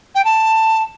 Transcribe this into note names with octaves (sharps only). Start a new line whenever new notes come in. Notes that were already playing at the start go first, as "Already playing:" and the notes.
G5
A5